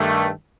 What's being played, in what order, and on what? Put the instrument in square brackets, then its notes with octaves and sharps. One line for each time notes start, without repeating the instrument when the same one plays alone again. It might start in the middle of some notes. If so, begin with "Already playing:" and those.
Already playing: [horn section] G2 D#3 A3